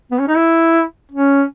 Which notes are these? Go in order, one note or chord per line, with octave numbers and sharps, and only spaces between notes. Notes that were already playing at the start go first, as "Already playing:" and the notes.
B3
C#4
D#4
E4
C#4